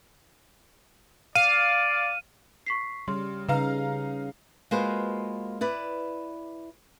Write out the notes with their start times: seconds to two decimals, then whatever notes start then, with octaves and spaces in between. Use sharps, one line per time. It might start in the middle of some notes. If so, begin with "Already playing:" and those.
1.35 D5 F5 D#7
2.66 C#6 B6 C7
3.08 C#3 G3 C6
3.49 C#3 D#4 B4 F5 A#5
4.71 G#3 A#3 F4 F#4 B4 C5
5.61 E4 B4 D5